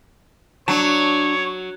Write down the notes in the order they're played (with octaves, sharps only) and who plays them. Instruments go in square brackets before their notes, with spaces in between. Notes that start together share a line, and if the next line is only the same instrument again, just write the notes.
[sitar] F#3 [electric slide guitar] D4 A5 [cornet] C#5